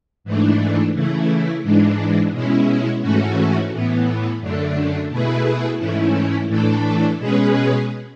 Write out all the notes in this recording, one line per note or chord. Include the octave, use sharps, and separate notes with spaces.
G#2 E3 A3 D4
C#3 E3 A3 E4
G#2 E3 G#3 D4
B2 G#3 C#4 E4
G#2 E3 A3 C#4 F#4
A2 E3 B3
F#2 D3 A3 D4
B2 A3 E4 G#4 B4
G#2 E3 A3 C#4 E4
A2 E3 A3 D4 A4
B2 G#3 C#4 G#4 B4